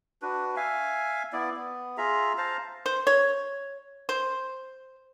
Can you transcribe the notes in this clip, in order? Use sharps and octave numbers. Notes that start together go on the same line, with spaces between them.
D4 F#4 B4
E5 F5 G#5
B3 E4 D5
B3
F4 G#4 E5 A#5
C5 F5 A5 A#5
C5
C#5
C5